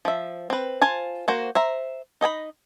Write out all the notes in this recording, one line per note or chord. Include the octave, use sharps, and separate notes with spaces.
F3 E5
C4 B4
F4 C5 G#5 A5
A#3 F#4 C5
C5 E5 A#5
D#4 D#5 G#5 B5